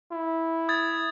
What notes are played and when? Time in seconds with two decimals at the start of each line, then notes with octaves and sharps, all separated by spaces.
0.12 E4
0.69 D#6 G#6 A6